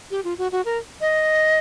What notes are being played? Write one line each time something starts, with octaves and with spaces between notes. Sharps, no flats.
G4
F4
F#4
F#4
A#4
D#5